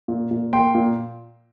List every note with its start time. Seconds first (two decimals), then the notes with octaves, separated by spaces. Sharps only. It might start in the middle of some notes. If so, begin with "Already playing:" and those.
0.08 A#2
0.31 A#2
0.53 A#3 G5 C6
0.75 A#2